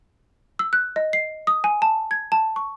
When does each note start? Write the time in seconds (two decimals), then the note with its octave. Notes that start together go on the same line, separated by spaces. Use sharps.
0.59 E6
0.73 F#6
0.96 D#5
1.13 C7
1.47 D#6
1.64 G#5
1.82 A5
2.11 G#6
2.32 A5
2.56 C#6